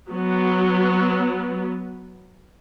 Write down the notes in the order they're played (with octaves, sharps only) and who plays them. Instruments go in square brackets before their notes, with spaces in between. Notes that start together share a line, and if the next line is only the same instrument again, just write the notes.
[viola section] F#3 B3